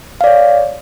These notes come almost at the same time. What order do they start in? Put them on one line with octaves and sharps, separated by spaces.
F5 D5 C#5